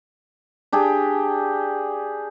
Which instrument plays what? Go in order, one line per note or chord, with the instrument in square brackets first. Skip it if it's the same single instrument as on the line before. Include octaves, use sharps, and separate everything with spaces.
[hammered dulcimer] D4 G4 G#4